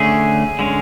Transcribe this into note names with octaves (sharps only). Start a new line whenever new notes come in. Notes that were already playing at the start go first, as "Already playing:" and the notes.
Already playing: D3 A3 C#4 G#4
D3 G#3 C#4